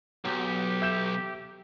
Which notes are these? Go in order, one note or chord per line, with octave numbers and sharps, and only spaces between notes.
B1 F#3 G4
E5 G6 E7